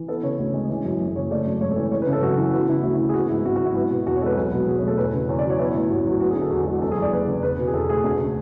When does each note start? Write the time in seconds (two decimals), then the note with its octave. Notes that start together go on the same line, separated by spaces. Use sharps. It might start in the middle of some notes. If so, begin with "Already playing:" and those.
Already playing: E3
0.08 B3 A4
0.23 C#3 C#5
0.39 D2
0.54 G#3
0.70 E3
0.85 F#2
1.00 F#1
1.16 C#3 C#5
1.30 A3 D5
1.45 F#2
1.61 G#1 C#5
1.72 A4
1.76 E3
1.81 C#5
1.91 G#3 C#5
2.02 B4
2.07 C#3
2.13 A4
2.22 F#2 F#4
2.37 E3 E4
2.53 B3 F#4
2.69 C#3 E4
2.83 D2 F#4
2.94 E4
2.99 E3
3.09 G#4
3.14 B3 F#4
3.29 G#2 E4
3.45 G#1 F#4
3.56 F#4
3.61 F#3
3.66 E4
3.75 B3 F#4
3.90 B2 F#4
4.06 E2 F#4
4.16 C#5
4.21 G#3 A4
4.26 B4
4.37 B1 B4
4.53 B2
4.67 B1 G#4
4.78 C#5
4.83 A3
4.88 A4
4.97 E2 B4
5.14 C#3
5.29 E2 C#5
5.39 D5
5.44 F#3
5.50 C#5
5.59 B3 E4
5.74 A2
5.89 A1 F#4
6.06 F#3
6.20 B3 F#4
6.31 G#4
6.36 D3
6.41 A4
6.51 E2 F#4
6.66 G#3 F#4
6.82 F#1 A4
6.92 G#4
6.97 E2 D5
7.12 F#1 B4
7.27 C#3
7.43 E2 B4
7.59 B2
7.67 G#4
7.73 E2 A4
7.89 A3 G#4
8.04 D2
8.19 C#3